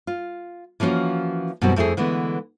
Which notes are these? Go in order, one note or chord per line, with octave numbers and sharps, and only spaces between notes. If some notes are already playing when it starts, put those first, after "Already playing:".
F4
E3 F3 A#3 C#4 F#4
F#2 B2 E3 G3 C4 F#4
F2 A3 E4 G4 G#4
D3 E3 G#3 A3 B3